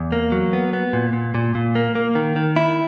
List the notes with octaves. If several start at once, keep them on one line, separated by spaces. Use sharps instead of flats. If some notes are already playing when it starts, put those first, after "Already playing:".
Already playing: E2
A#3
F#3
B3
B3
A#2
A#2
A#2
A#2
A#3
A#3
D#3
D#3
E4